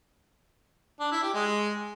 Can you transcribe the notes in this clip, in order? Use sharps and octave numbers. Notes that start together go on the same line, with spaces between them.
D4
E4
G4
G#3